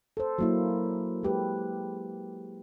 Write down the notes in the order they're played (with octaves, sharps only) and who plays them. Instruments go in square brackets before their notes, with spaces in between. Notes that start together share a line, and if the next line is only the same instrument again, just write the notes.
[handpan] A4 C5
F#3 A#3 E4
G#3 G4 B4